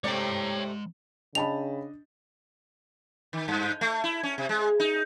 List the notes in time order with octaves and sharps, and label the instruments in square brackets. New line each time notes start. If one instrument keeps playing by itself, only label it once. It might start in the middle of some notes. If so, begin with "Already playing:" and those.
[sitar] C3 A3 D5 [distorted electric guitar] G#3 A#5 [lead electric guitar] C#5 G5
[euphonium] C#3 [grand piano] D4 D#5 [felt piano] G5 A5 B5 [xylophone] F7
[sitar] D#3
G2
A3
E4
C#4
C3
G#3
D#4